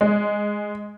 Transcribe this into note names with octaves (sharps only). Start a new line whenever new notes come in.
G#3